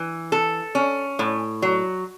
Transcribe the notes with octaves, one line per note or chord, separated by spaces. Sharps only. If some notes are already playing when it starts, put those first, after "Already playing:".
Already playing: E3
A4
C#4
A2
F#3